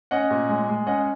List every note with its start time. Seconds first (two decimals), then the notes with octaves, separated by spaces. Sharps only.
0.11 C#4 D#5 F#5
0.30 A#2
0.49 G#3
0.69 G#3
0.87 C#4 D#5 F#5